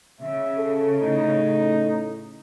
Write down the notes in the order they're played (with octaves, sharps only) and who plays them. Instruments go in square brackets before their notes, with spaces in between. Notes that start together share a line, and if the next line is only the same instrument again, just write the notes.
[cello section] C#3 [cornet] E5
[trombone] A4
[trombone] A2 [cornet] D#4